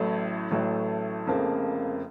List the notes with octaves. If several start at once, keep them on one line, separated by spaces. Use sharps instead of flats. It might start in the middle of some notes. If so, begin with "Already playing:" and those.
Already playing: A1 A2 F#3 A3
A1 A2 F#3 A3
F1 F2 C#3 F3 A#3